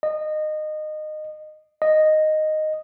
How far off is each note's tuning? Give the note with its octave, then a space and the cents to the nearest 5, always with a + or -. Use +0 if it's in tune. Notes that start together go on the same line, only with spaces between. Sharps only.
D#5 -20
D#5 -5